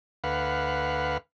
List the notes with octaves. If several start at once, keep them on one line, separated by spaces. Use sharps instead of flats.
D2 B4 F5 F#5